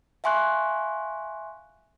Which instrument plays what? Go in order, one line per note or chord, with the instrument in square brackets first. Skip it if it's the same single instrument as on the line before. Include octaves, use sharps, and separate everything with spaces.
[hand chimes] E5 F5 G#5 C6 C#6 F#6